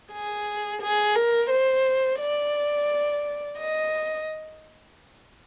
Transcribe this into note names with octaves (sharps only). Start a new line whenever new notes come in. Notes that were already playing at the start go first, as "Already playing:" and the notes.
G#4
G#4
A#4
C5
D5
D#5